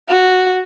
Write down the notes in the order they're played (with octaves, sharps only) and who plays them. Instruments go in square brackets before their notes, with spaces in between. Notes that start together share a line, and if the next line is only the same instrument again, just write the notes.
[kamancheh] F#4